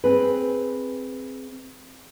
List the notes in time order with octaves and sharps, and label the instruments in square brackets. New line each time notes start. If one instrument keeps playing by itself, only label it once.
[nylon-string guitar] C4 G#4 B4